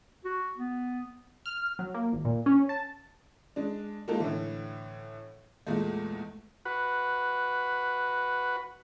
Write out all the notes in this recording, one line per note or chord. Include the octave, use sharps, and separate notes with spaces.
F#4
B3
F6
F#3
A#3
G#1
A#2
C#4
A5
G#3 D4
G#3 A#3 D#4 F4 F#4 A4
A2 D3 E3
E2 A#2 G#3 A3
F#4 B4